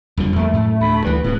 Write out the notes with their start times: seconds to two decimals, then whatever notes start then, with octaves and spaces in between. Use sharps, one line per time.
0.17 F#1 F2 D3 F3 G3
0.36 E2 F3 A3 A#3
0.53 F#2 A2
0.81 D2 B5
1.04 D2 G2 E3 B4
1.24 D1 A2 C3 G#3